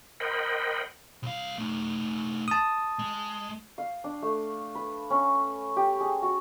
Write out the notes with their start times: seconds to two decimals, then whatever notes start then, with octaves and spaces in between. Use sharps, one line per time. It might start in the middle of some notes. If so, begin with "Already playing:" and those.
0.20 A#4 C5 D#5 F#5 G5 B5
1.23 C2 F5
1.58 A3 D#4
2.48 A5 D#6
2.99 G#3
3.78 F5
4.04 D4
4.22 A3
4.75 B4
5.10 C#4
5.76 G4
6.00 G#4
6.22 F#4